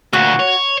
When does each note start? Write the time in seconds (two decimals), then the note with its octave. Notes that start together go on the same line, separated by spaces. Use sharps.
0.13 D2 A#2 F#4
0.39 C#5